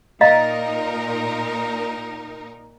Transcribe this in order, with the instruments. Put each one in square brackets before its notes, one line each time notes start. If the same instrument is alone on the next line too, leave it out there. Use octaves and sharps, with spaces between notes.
[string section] A#2 D#4 A#4 [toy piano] D#5 F5 A#5